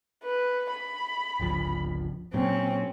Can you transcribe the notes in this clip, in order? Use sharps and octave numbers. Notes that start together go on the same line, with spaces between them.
B4
B5
G1 C#2 F3
A#2 F#3 C4 C#4